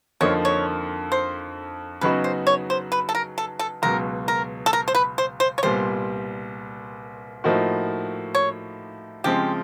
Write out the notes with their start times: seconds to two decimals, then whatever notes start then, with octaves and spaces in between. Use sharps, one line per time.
0.21 F2 D3 F3 A#3 D#4 C#5
0.45 C#5
1.12 C5
2.01 C#3 F#3 B3 D#4 F#4 B4
2.24 C5
2.47 C#5
2.70 C5
2.92 B4
3.09 A4
3.15 A#4
3.38 A4
3.59 A4
3.82 C#2 B2 F#3 A#4
4.28 A#4
4.66 A4
4.73 A#4
4.88 C5
4.95 B4
5.18 C5
5.40 C5
5.58 C#5
5.63 C2 A#2 G3 B3 C5
7.44 A2 F3 A#3 D#4 F#4
8.35 C#5
9.24 C#3 F3 G#3 C4 G4